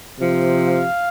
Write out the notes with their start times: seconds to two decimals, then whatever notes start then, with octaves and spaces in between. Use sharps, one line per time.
0.19 C3 F3
0.67 F5